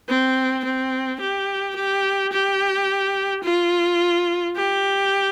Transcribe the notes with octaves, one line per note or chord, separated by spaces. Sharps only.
C4
C4
G4
G4
G4
F4
G4